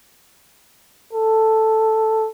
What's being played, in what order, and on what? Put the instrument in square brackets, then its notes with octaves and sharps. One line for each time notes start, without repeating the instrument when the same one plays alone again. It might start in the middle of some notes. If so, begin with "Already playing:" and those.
[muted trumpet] A4